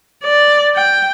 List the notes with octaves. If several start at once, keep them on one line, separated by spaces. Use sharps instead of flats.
D5
G5